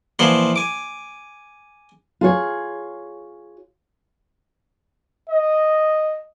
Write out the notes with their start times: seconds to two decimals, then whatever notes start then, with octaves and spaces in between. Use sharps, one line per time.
0.19 A#2 E3 F3 C#5 F#5 C6
0.56 G#5 D6
2.21 F4 G#4 C#5
5.30 D#5